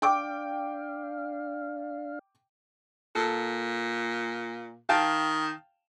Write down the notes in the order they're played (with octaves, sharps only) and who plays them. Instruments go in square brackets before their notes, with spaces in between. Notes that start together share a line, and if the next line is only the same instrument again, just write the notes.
[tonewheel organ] D4 F5 [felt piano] G5 D6
[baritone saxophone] A#2 [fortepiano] A4
[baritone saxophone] D#3 [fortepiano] F5 G5 A5